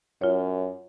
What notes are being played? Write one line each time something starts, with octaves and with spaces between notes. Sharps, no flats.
F#2 F4 C#5